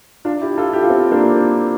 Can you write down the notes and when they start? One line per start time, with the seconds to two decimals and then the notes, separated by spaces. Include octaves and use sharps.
0.25 D4 F4
0.41 E4 G4
0.58 F4 A4
0.73 E4 G4
0.82 F4
0.90 C4 E4
1.12 A#3 D4